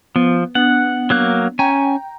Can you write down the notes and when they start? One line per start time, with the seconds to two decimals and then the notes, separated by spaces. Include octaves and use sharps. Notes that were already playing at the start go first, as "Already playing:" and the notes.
0.16 F3 B3
0.55 B3 D4 F#5
1.10 F#3 A#3 F#6
1.59 C#4 G5 G#5 A#5